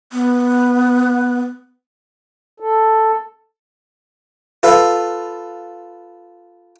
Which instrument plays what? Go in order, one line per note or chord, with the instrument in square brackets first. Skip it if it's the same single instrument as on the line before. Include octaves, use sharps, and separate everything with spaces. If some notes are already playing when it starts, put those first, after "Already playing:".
[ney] B3
[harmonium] A4
[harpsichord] F4 A4 B4 F5